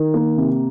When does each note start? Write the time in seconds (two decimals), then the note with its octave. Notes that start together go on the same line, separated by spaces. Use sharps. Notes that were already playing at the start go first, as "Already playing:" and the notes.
Already playing: D#3
0.14 A#3
0.37 C3